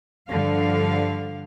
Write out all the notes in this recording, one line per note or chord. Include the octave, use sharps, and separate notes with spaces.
G2 D3 F3 F5